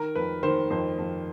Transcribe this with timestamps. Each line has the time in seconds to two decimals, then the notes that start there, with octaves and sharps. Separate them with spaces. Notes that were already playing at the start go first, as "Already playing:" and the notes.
Already playing: D#3 A#4
0.15 F2 B4
0.43 D#3 C5
0.70 F2 C5
0.98 F2